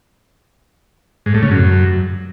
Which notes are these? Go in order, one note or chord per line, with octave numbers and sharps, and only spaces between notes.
G#2
A2
C#3
F#2